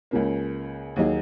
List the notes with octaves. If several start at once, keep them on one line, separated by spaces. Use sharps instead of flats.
C#2 C#3 A#3
D#2 D#3 F#3 D#4 G#4